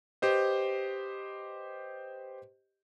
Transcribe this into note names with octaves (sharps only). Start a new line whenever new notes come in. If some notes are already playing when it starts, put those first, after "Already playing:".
G4 B4 C5 D#5